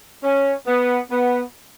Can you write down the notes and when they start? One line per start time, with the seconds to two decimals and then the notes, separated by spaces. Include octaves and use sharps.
0.23 C#4
0.67 B3
1.10 B3